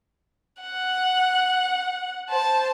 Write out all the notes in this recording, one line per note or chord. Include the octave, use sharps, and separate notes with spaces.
F#5
C5 A5